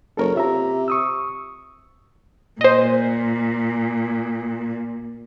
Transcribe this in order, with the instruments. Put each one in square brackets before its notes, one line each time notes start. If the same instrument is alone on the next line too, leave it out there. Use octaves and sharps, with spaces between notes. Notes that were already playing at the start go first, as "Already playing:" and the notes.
[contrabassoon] F#1 [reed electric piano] A4 A#4 C#5
[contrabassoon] C3 [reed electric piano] F4 E5 A#5
[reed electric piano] C#6 D#6 E6
[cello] A#2 [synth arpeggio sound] C5 D#5